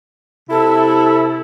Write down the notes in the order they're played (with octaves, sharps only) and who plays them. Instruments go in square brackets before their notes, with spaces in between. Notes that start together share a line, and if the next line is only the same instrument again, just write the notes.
[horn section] C3 E4 [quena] A4